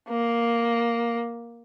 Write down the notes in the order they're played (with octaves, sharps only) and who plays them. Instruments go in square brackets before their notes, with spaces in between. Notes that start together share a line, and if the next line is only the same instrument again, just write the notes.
[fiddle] A#3